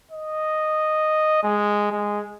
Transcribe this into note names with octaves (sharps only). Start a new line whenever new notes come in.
D#5
G#3
G#3